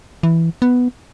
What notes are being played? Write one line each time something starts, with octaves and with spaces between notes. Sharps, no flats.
E3
B3